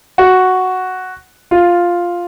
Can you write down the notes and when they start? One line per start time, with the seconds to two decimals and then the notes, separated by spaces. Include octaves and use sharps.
0.18 F#4
1.51 F4